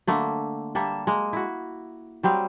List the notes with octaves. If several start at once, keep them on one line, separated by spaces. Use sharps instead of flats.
D3 A3 A#3
G3 A#3 A4 E5
G#3 A#3
E4 F#4
F#3 G3 C4 F5